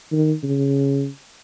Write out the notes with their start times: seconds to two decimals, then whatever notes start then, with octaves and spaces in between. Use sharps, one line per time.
0.12 D#3
0.43 C#3